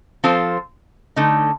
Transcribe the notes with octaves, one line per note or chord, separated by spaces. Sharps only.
F3 C4 F4 A4 C5
D3 A3 D#4